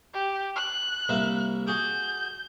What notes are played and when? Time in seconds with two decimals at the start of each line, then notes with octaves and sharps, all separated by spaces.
0.14 G4
0.56 F#6
1.09 C2 A#3 E5
1.67 F#4 G#4 D6 G6